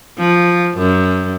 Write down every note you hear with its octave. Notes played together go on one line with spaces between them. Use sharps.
F3
F#2